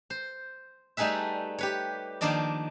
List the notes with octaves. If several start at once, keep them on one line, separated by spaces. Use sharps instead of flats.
C5
G3 A3 D#4 G#4 B4 E5
G4 B4 C#5
D#3 F3 A#3 D4 D5 D#5